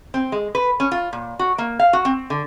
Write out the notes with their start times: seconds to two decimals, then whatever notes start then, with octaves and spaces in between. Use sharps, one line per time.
0.14 C4
0.32 G#3
0.55 B4
0.80 C#4
0.92 F4
1.13 A#2
1.39 F#4
1.58 A#3
1.79 F5
1.93 F#4
2.05 C4
2.30 D3